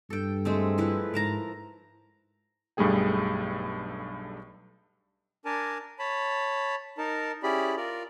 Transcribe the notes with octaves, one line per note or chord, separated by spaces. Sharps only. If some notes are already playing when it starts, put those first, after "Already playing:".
G2 A4 G5
G#3 A3 C4
F3 E4 B4
G#2 A#4 A5 A#5
B1 G2 G3 A3 G#4 G5
D4 A#4 G#5 A5
C#5 A5 B5
D#4 A#4 A5
C#4 E4 G4 G#4 D5 B5
F4 A#4 D5